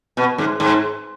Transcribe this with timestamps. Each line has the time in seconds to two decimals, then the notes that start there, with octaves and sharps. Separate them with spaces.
0.17 B2
0.38 G#2
0.60 G#2